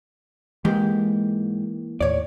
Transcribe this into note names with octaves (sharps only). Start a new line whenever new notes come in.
G#2 E3 G#3 A#3 G4
D#2 A2 C#5 D5